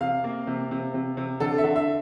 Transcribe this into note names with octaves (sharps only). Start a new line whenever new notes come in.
C3 F5
A#3
C3
C3
C3
C3
D3 A4
E5
D3
E5